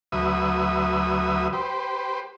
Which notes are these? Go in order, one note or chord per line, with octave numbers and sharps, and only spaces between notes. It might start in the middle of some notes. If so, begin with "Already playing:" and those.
D2 F#3 B4 E5 D#6
G4 B4 C5